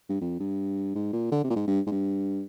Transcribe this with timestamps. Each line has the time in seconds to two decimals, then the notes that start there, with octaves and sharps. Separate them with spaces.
0.09 G2
0.21 F2
0.40 G2
0.95 G#2
1.13 A#2
1.32 D3
1.44 C3
1.50 A#2
1.56 G#2
1.67 G2
1.87 G#2
1.92 G2